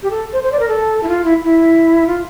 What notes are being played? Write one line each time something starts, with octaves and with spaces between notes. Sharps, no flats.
G4
A4
C5
C5
D5
A#4
A4
E4
F4
E4
E4
F4